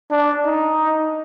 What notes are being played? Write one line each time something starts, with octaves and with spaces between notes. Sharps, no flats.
D4
D#4